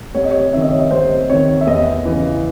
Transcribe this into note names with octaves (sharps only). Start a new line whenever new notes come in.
C2 C#5
D#5
C#5
C3 D#3 E5
D#5
C#5
D#5
C2 C5
C3 D#3 C#5
E5
E2 D#5
C#3 E3